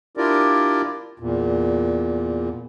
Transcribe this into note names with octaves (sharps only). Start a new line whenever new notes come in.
D4 E4 F4 G4 A#4 D5
E2 A#2